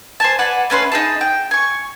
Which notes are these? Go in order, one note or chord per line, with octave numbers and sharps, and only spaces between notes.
C5 G#5 A5
B4 D5 F#5 G#5
A3 C#4 B4 C6
D#4 G#4 A5
G5
G#5 C#6